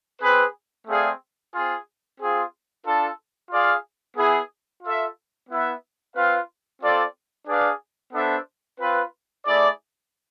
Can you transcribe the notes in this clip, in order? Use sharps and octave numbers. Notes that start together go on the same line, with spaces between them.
C4 G#4 B4
A3 C4 G#4 D5 F5
C4 F4 G#4
C4 F4 G#4
D4 F4 A4
F4 G#4 D5 F5
B3 E4 G#4
F4 A4 E5
B3 E4 B4 E5
C4 F4 B4 F5
C4 F4 A4 D5
D4 G#4 B4 D5 F5
B3 D4 A4 C5 E5
C4 F4 B4
A3 E4 G#4 D5